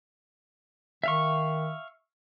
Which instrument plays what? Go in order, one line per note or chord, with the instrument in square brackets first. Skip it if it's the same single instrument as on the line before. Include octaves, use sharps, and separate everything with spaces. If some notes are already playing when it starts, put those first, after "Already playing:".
[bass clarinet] D#3 [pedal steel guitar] E5 F5 C#6